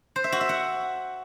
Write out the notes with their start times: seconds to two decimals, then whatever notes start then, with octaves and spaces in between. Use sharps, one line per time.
0.16 C5
0.24 E5
0.32 F#4
0.41 E5
0.49 F#5